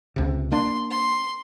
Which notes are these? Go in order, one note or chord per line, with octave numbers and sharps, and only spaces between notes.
C#2 C3
A#3 D4 C6
C6